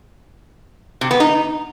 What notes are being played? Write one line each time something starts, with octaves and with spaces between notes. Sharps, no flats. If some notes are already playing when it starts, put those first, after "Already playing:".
C3
B3
D#4